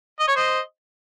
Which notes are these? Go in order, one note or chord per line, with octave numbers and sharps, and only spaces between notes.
D#5
C#5
C5 D#5